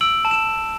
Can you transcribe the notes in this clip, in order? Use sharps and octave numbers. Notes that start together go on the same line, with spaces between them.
E6 D7 F#7
A5
E7